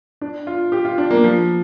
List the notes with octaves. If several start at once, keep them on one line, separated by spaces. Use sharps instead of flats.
D4
F4
G4
F4
D4
A#3
F3